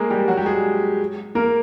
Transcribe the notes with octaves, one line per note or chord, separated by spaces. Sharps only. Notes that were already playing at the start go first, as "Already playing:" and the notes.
Already playing: G#3 A#3 G#4 A#4
G3 G4
F#3 F#4
G3 G4
G#3 G#4
A#3 A#4